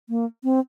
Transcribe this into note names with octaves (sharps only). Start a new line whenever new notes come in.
A#3
C4